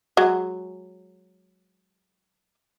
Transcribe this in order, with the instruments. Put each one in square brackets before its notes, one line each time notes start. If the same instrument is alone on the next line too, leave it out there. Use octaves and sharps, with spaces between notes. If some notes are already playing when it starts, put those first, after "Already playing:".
[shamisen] F#3 G#3